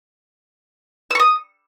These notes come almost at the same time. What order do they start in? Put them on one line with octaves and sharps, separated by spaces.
E6 C#6 D#6